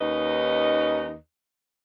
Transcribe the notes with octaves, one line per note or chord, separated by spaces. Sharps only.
D#2 C#4 D#4 B4 D#5